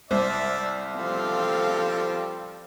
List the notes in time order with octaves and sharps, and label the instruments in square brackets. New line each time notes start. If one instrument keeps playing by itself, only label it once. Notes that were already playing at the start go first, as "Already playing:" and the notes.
[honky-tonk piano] C2 [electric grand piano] C5 [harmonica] D5 E5
[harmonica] F3 G3 C4 [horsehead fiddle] A4 F5